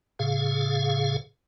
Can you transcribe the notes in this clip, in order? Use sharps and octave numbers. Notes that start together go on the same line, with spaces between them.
A2 C#3 G#4 F5